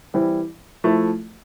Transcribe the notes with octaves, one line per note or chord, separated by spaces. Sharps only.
E3 G3 C4 E4
F3 A3 E4